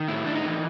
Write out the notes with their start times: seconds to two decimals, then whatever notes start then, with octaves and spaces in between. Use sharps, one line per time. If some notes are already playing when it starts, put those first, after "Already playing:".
Already playing: D#3
0.08 A2 E4
0.26 A2 D4
0.35 D#4
0.45 E3